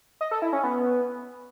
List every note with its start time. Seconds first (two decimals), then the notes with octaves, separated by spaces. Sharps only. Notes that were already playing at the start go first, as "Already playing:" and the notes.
0.21 D#5
0.31 A4
0.42 E4
0.53 C#4
0.63 B3